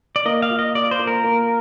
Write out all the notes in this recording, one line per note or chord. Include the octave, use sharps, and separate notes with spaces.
D5
A#3 D#5
F5
F4
D#5
F4 D5
C5
A#3
A#4
A#3